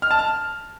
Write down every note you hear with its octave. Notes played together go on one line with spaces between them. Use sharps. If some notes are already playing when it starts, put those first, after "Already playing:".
F6
A5
F6